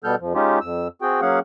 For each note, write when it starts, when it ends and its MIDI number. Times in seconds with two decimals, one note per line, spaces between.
0.04 0.15 47
0.04 0.15 55
0.04 0.15 59
0.04 0.15 69
0.04 0.15 89
0.04 0.15 91
0.20 0.33 41
0.20 0.33 53
0.35 0.59 56
0.35 0.59 61
0.35 0.59 63
0.35 0.59 65
0.35 0.59 67
0.61 0.88 41
0.61 0.88 88
1.02 1.21 60
1.02 1.21 66
1.02 1.21 68
1.02 1.21 79
1.21 1.39 54
1.21 1.39 58
1.21 1.39 61
1.21 1.39 68
1.21 1.39 77
1.21 1.39 78